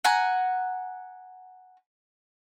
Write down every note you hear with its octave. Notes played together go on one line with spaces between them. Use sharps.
F#5 G#5 A#5